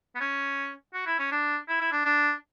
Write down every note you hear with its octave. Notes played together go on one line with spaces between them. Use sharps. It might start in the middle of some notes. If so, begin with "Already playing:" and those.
B3
C#4
F#4
E4
C#4
D4
E4
E4
D4
D4